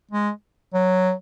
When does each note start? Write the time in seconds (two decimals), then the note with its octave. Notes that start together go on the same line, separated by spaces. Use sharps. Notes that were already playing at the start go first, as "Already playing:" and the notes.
0.11 G#3
0.74 F#3